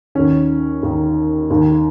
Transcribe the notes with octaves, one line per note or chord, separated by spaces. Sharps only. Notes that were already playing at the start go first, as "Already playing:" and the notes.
D#2 D#3 C#4
D#2 D#3
D#2 D#3